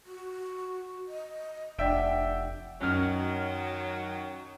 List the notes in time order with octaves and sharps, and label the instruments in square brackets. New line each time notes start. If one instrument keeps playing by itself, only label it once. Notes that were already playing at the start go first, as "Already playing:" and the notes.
[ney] F#4
D#5
[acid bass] F1 [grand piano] D4 E5 G5 [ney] F#5
[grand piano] F#2 F6 [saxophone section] D#3 F#3